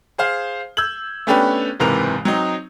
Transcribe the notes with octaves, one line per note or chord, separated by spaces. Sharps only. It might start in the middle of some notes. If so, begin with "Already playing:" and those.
G#4 C5 F5
E6 G6 G#6 F#7
A3 B3 C#4 D4 G4 B4
F#1 G#2 C3 E3 A#4 F7
F#3 C4 D#4